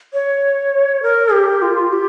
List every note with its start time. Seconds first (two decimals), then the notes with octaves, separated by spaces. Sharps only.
0.13 C#5
1.03 A#4
1.32 G4
1.62 F4
1.93 G4